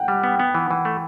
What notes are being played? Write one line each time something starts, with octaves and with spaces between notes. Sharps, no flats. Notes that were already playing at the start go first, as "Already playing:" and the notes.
Already playing: F#5 G5
G3
B3
B3
E3
E3
A3